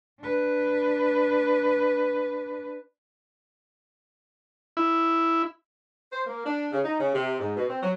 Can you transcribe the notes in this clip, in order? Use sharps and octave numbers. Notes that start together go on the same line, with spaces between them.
D4 B4
E4
C5
A#3
D4
C#3
D#4
C#3
C3
G#2
B2
C4
F#3